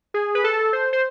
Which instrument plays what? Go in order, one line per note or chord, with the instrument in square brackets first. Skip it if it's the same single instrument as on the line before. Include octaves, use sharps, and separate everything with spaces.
[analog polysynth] G#4
B4
A4
C5
C5